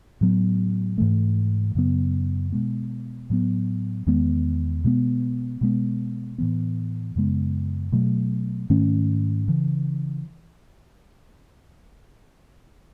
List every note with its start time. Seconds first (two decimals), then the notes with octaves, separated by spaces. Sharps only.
0.21 A2 F#3 B3
0.98 G#2 E3 A3
1.75 F#2 C#3 F#3 B3
2.52 B2 G#3 B3
3.30 A2 F#3 B3
4.06 E2 D#3 G#3 B3
4.84 B2 G#3 B3
5.61 B2 G#3 B3
6.38 A2 E3 B3
7.16 F#2 C#3 G#3 B3
7.92 B2 F#3 A3
8.70 G#2 D#3 A3 C#4
9.48 C#3 E3